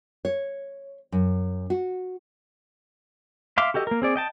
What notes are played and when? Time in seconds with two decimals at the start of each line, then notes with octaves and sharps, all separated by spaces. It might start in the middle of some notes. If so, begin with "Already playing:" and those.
0.25 C#5
1.12 F#2
1.70 F#4
3.58 E5 F5 C6 D6
3.74 F#4 G4 A4 D#5
3.87 A#3 A#4
4.02 C4 G#4 D5
4.16 D#5 G5 A5